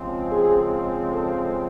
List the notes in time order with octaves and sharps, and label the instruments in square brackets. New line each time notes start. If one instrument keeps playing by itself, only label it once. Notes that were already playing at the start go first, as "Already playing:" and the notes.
Already playing: [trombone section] C#3 F3 G#3 C4
[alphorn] G#4
A4